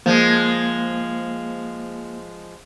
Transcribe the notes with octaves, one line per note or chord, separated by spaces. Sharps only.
F3 G#3 A#3